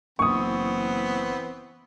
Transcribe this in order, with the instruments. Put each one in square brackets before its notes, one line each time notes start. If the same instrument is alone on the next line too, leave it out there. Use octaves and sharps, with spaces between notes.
[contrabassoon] F#1 [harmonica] E3 B3 C4 [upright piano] C#6 D#6